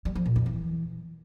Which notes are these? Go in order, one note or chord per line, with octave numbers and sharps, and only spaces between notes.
G3
F3
A#2
F2
E3